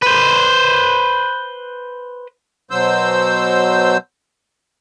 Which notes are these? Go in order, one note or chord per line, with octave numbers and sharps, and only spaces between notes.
B4 C5
B2 F#3 C5 E6 G6